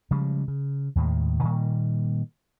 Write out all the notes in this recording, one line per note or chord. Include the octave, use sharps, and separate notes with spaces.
C#3 F3 G3 G#3
C#3
D#2 A2 D#3 G#3
A#2 D#3 G3 A#3